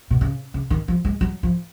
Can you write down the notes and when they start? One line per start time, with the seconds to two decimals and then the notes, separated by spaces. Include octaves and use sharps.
0.11 B2
0.21 C#3
0.54 C#3
0.70 D#3
0.88 F3
1.05 G#3
1.21 F#3
1.43 F3